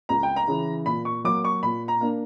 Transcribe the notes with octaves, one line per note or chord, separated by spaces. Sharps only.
C#2 A#5
G5
A#5
C#3 E3
A#2 B5
C#6
F#3 A#3 D6
C#6
A#2 B5
A#5
A#3 D4